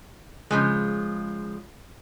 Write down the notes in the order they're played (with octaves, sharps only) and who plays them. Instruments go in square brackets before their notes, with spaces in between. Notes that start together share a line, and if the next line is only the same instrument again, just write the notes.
[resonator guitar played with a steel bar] C#3 F3 G#3